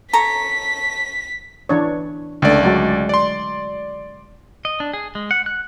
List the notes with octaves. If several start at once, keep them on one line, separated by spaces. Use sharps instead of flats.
A4 C#5 A#5 B6
E3 D4 C#5
C#2 D3 A3 D5
F#3 G#3 F#4
D5 C6
D#5
D4
G#4
G#3
F#5
F#6